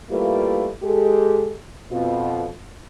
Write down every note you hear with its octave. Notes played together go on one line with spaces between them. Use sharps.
G3 A3 A#3 E4 F4 B4
G#3 G4 A4
F2 B2 F4